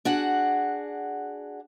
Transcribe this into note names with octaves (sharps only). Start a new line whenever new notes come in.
D4 F#4 G#4 F#5